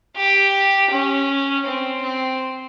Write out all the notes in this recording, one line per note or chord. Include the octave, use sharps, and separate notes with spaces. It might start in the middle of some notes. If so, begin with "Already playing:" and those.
G4
C#4
C4
C4